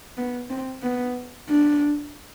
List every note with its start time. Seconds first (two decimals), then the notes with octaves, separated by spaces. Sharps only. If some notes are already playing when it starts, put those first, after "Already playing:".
0.17 B3
0.50 C4
0.83 B3
1.49 D4